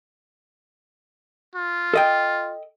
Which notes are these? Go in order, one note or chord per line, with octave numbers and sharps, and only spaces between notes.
F4
A4 D#5 G5